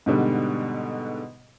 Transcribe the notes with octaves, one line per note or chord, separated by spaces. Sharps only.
G#2 B2 D3 G3